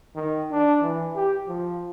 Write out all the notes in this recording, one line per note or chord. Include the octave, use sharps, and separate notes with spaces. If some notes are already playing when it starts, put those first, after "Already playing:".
D#3
D4
E3
G4
F3